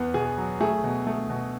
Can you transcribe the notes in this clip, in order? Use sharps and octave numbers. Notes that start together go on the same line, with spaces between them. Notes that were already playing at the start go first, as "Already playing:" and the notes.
Already playing: E2 B3
B2 G#4
F#3
A3 G#4
B2
A3
B2